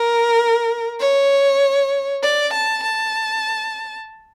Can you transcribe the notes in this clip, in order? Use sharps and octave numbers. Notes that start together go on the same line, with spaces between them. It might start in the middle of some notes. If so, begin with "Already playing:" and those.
Already playing: A#4
C#5
D5
A5
A5